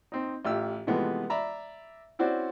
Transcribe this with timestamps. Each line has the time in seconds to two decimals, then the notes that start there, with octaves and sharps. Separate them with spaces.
0.12 C4 D#4
0.45 A1 F4 G4 E6
0.87 C3 E3 F3 G#3 A3 B3
1.30 D5 E5 A#5 B5
2.19 C4 C#4 E4 F#4 C5 D5